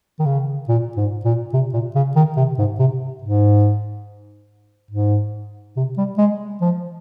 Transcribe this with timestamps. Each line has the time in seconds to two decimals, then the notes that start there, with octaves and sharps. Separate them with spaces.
0.20 D#3
0.26 C#3
0.69 A#2
0.97 G#2
1.25 A#2
1.53 C3
1.73 A#2
1.95 C#3
2.16 D#3
2.37 C3
2.58 G#2
2.79 C3
3.22 G#2
4.91 G#2
5.77 C3
5.98 G3
6.18 G#3
6.61 F3